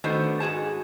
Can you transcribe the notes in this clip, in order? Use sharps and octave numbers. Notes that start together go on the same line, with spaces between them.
D#3 A3 B3 D4 F#4 C5
G#2 F#4 G#4 A5